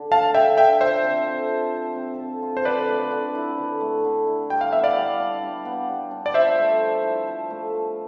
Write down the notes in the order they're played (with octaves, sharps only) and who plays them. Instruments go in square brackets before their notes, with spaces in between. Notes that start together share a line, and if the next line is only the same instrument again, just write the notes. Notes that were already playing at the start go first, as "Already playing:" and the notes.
Already playing: [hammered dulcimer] D3 D4
[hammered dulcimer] A3 [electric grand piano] F5 A5
[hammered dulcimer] D3 [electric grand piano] E5 G5
[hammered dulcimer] D4 [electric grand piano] E5 G5
[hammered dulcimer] F3 [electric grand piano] C5 E5
[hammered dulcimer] C4
A4
F4
F3
C4
A4
F4
[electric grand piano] C5
[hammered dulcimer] D3 [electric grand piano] B4 D5
[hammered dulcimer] A3
D3
E4
D3
A3
D3
E4
[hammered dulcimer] G3 [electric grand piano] G5
[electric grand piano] F5
[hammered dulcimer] B3 [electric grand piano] E5
[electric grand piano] D5 F5
[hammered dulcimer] G3
D4
G3
B3
G3
D4
[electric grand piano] D5
[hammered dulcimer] F3 [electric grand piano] C5 E5
[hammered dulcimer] A3
F3
E4
F3
A3
F3